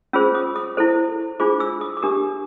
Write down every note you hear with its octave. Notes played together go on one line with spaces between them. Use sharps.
C#4 F4 G#4 C5 E6
D#6
D#6
E4 A4 C5
D4 F4 G#4 C5 D6
E6
D#6
D6
D4 G4 A#4 D#6